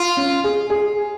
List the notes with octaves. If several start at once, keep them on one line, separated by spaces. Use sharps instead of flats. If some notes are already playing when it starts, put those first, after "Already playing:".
Already playing: F4
C#4
G#4
G#4